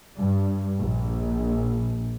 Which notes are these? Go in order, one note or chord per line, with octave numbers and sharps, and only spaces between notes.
G2
A#1